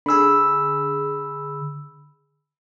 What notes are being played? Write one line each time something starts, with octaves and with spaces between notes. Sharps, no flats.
D3 G#4 B5 E6